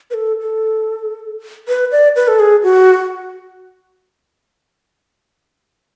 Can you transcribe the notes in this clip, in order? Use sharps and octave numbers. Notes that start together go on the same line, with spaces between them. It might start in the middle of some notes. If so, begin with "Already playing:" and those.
B4
A4
A4
B4
D5
B4
A4
G#4
F#4